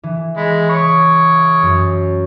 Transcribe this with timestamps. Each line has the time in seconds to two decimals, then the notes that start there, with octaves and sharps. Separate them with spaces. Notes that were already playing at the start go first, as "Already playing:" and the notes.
0.03 E3
0.37 G#3 B5
0.70 C#5 C#6 D#6
1.63 F#2